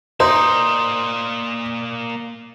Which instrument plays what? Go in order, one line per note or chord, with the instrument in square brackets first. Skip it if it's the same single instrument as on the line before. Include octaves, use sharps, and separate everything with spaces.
[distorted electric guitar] A#3 D5 [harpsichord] D#4 [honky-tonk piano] C5